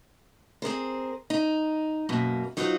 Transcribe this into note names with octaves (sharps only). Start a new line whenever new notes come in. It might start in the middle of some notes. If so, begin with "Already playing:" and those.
C4 G#4 A#4 C5
D#4
F#2 B2 A#3
F#3 D#4 F4 F#4 A#4 C5